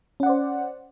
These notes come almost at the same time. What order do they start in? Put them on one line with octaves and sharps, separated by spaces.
C#4 F#5 D5 C5